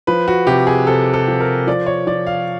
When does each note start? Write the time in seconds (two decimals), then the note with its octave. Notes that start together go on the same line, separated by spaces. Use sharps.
0.07 F3 B4
0.28 F#4
0.47 C3 G4
0.67 G#4
0.87 C3 A4
1.14 A4
1.28 F3
1.40 A#4
1.67 F3 D5
1.87 C#5
2.07 F3 D5
2.27 F5